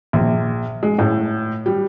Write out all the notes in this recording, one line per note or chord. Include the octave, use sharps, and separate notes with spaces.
A#1
G#3
A2
G3